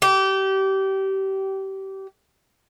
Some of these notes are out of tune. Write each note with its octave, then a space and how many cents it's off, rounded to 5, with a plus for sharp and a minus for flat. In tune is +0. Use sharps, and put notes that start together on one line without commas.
G4 -25